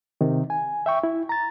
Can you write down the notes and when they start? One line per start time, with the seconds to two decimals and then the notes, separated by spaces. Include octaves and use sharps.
0.21 C3 D#3
0.50 G#5
0.86 E5 G5 C#6
1.03 E4
1.29 A#5 A6